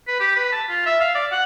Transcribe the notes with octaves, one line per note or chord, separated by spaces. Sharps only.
B4
G4
B4
A5
F4
E5
F5
D5
F#5